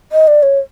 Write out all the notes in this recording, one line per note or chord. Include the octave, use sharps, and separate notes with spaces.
D#5
D5
C#5